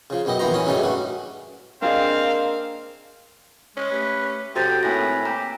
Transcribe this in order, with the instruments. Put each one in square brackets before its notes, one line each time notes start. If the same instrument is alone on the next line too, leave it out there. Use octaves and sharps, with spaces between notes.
[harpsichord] C#3 F3
B1 F#2 B3 G4 D#5
A#1 D#2 E3 B3 C5 A#5
E3 C#4 D#6
F#2 A2 C#3 G3 C#4 D#4
G2 A3 F#4
[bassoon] A#3 [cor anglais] C4 [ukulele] D4 G#4 D#5 [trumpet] F5
[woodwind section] G#3 [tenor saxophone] C#4
[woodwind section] A3 G4 B4
[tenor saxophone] C3 [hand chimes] F#4 A4 A6 [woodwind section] G5
[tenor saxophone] A2 [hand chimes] A#3 G#5 A#6 [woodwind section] C4 D#4 B4
[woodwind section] C4 G4 [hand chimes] A#5